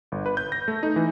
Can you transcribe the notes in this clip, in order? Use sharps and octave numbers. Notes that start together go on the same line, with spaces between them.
G1
B4
G6
A#6
A3
D#4
E3